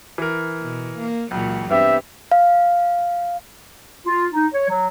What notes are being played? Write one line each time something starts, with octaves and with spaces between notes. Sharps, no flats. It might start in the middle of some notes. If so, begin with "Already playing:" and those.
E3 A#4
B2
A#3
C#2 A#2 E3 F#3
G2 B3 C4 G4 E5
F5
F4
D#4
C#5
F#3